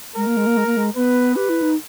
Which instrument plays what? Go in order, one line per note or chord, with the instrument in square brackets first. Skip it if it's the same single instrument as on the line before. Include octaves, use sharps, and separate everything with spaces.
[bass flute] G#3 [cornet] A#4
[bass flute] A#3
G#3
A#3
G#3
A#3
G#3
[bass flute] B3 [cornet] B4
[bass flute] G4 [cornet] B4
[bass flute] E4
D#4